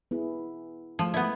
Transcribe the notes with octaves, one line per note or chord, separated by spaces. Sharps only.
B3 E4 G#4
F3 G#3 A3
A3 B3 E4